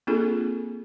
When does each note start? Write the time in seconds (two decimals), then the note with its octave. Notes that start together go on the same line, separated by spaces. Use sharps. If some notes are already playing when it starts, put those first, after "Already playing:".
0.07 A#3 C4 D4 F4 G#4 A4